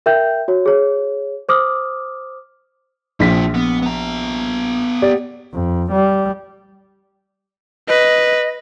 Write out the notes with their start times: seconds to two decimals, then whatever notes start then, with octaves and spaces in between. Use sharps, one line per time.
0.06 A#4 E5 G5 G6
0.48 F#4 C#5
0.66 G#4 C#5
1.49 C5 D6 D#6 F6
3.20 A#1 C3 F3 B6
3.55 B3
3.82 B3 A#5
5.02 G4 D5
5.53 F2
5.91 G3
7.88 B4 D#5